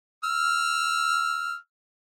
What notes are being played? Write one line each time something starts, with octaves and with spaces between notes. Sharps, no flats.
E6 F6